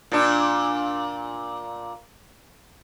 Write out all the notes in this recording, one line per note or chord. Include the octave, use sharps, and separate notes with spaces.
A#2 D4